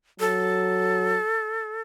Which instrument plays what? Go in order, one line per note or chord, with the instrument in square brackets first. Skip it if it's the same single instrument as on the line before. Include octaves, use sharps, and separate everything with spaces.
[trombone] F#3 [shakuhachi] A4